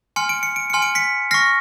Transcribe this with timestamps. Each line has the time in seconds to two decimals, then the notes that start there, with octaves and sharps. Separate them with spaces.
0.16 G#5 C6 F6 C#7
0.29 D7
0.43 C#7
0.56 D7
0.70 G#5 C6 F6 C#7
0.82 D7
0.95 B6 C#7
1.31 C#6 F6 A#6 C7